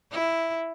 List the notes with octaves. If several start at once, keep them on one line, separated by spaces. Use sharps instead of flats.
E4